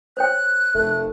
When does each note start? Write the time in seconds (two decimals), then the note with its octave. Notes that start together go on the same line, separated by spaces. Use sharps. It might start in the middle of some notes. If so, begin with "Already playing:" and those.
0.17 C5 C#5 G5 F#6
0.75 F1 A3